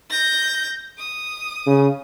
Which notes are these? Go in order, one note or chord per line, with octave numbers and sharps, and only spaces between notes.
G6 A#6
D#6
C#3